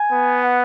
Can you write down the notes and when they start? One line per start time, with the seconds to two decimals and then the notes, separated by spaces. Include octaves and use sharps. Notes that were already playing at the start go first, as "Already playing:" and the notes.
Already playing: G#5
0.12 B3
0.43 F#5